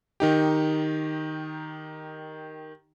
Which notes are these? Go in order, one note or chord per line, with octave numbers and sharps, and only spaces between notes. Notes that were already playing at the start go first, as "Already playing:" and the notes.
D#3 D#4 G4